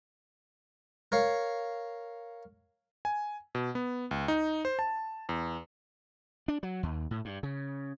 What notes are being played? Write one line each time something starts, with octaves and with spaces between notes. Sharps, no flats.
A#4 C#5 F5
G#5
B2
B3
C#2
D#4
C5
A5
E2
D4
F#3
D#2
A2
G2
C#3